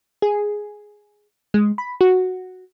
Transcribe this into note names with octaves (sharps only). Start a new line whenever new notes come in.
G#4
G#3
B5
F#4